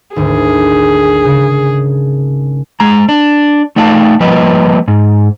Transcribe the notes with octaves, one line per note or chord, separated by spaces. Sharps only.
G#1 D2 G#4
C#3
G#3 A#5
D4
A3 D#4 D5 F5 G#5 A5
F3 G3 A#3 B4 D#5
G#2